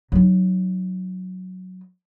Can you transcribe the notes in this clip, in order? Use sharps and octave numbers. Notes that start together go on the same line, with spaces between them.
F#3 D#4